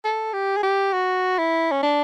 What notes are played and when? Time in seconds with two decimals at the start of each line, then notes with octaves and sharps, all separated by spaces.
0.04 A4
0.33 G4
0.57 G#4
0.63 G4
0.93 F#4
1.38 E4
1.71 C#4
1.83 D4